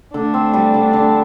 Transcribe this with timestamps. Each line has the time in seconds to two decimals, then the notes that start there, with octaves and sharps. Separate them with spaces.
0.14 D3 A3 D4
0.34 C4
0.53 G3
0.74 D3
0.93 D3